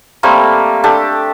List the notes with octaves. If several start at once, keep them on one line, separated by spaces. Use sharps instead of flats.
G3 A3 A#3 C4
D4 G4 A4